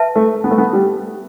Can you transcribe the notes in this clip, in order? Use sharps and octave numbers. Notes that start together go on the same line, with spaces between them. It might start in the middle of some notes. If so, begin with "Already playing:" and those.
Already playing: B4 E5 A5
A3
B3
A3
B3
G3